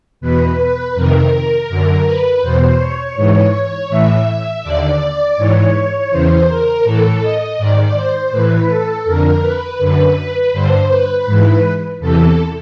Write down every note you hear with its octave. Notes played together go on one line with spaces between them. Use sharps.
E2 B2 B4
B4
F2 C3 D#3 A#4
F#2 D3
B4
E2 B2 C5
C#5
G#2 E3
A2 E3 E5
D#2 D3 D5
G#2 E3 C#5
E2 C#3 E3 C5
A#4
A2 E3 A4
D#5
G#2 D#3 D5
C5
A2 E3 B4
A4
F2 D3 A#4
B4
F#2 D3
G2 D3 C5
B4
G#2 E3
E2 C3 E3 A4